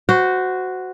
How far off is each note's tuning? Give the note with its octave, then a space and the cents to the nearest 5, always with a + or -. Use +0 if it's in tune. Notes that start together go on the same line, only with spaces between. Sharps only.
F#4 +0 C5 -20